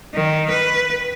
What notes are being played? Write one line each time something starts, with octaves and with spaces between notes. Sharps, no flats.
D#3
B4